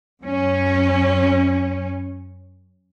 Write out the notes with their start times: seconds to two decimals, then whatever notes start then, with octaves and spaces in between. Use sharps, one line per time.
0.22 F#2 C#4